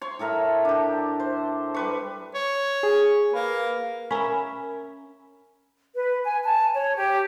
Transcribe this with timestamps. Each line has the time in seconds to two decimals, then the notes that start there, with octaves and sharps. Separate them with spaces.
0.02 C#5 C6
0.19 A2 A4 A#4 E5
0.65 D4 G4
1.20 C5
1.74 G3 B4 C#6
2.34 C#5
2.83 G#4
3.33 A#3 B4
4.11 C#4 A#4 E5 B5
5.95 B4
6.23 G#5
6.43 A5
6.74 C#5
6.95 G4